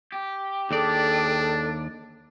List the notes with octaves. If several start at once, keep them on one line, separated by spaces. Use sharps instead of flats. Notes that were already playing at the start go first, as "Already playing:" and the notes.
G4
D#2 D4 G#4 A4 D5